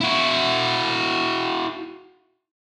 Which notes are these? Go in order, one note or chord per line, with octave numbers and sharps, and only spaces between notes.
E4 F#4